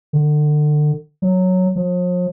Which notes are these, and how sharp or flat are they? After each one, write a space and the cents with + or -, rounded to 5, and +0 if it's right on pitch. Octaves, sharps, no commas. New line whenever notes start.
D3 +30
F#3 -5
F3 +45